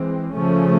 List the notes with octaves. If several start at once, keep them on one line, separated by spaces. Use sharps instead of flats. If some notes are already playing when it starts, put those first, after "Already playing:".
Already playing: E3 G#3 C4
C#3 F3 A3 C#4